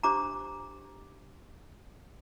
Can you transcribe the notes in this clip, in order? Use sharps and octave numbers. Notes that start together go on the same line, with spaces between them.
D4 G4 C5 A#5 D6